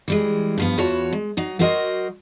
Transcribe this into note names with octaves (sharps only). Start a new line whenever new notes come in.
E3 G3 G#3
G2 F3 B3
E2 F4 F#4 B4 C#5 A5
G#3
F#3 D#4
F#3 F#4 A#4 C5 D#5